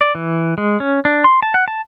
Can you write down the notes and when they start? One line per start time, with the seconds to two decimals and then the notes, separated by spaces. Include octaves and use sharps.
0.01 D5
0.15 E3
0.58 G#3
0.80 C#4
1.05 D4
1.24 C6
1.42 A5
1.54 F#5
1.68 A5